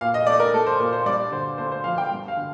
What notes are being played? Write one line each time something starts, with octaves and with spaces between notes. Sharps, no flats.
A#2 F5
D#5
A3 D5
A#4
A3 A4
C5
A#2 A#4
C5
G2 D5
D3 C5
A3 C5
C5
F3 F5
G5
G2
F5
D3